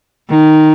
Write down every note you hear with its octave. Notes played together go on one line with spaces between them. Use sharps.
D#3